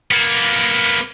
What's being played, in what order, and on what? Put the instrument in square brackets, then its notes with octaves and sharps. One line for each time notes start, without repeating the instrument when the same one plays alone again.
[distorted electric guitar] A#3 B3